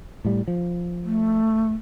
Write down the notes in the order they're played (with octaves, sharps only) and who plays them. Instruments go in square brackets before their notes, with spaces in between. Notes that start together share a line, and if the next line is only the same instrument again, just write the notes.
[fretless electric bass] A2 G3
F3
[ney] A3